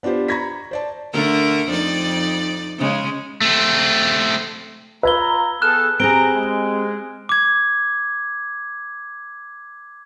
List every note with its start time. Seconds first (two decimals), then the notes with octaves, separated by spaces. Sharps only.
0.03 B3 D4 F4 G4 C5
0.28 A#5 B5 C#6 G#6 A#6 B6
0.71 C5 D5 A5
1.13 D3 A3 A#4
1.68 F2 D#4 D5
2.78 C#3 G#3
3.41 A3 C4
5.03 F4 B4 A#5 E6 G#6 G7
5.62 B3 G#4 A4 F6 F#6 E7
6.00 C4 G4 G#4 A#5 D7 G7
6.34 G#3
7.29 D6 G#6